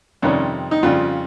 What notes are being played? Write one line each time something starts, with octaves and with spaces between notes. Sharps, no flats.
F2 C3 D#3 G3 C#4
D#4
F2 C#3 G3 F4